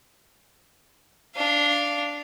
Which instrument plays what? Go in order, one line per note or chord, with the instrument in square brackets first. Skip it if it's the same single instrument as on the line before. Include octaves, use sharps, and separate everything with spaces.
[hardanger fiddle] D4 F5